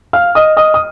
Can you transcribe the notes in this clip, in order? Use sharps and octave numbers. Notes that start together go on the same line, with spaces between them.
F5 F6
D#5 D#6
D#5 D#6
D#6